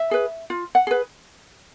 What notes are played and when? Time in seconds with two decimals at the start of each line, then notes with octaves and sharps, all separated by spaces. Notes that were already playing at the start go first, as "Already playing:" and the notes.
Already playing: E5
0.11 G#4 B4
0.50 F4
0.75 F#5
0.87 G#4 B4